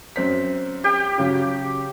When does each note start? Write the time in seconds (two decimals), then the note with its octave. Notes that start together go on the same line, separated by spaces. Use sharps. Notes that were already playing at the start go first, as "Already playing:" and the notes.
0.16 F#2 C4 B6
0.84 G4 G5
1.18 C#3 F#3